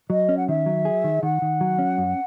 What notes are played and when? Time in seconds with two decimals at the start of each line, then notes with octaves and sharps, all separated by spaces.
0.10 F#3 D#5
0.29 C#4
0.37 F#5
0.48 D#3 E5
0.66 F#3
0.85 G#4
1.04 D#3
1.23 D#3 F#5
1.42 D#3
1.61 F#3
1.79 C#4
1.98 F#2